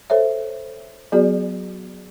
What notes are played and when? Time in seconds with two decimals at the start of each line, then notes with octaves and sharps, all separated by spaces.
0.10 A4 C5 C#5 E5
1.12 F#3 B3 F#4 G#4 D5